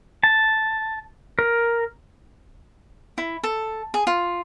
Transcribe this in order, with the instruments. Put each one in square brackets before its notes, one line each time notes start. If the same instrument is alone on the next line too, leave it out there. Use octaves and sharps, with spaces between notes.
[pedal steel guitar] A5
A#4
[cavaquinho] E4
A4
G#4
F4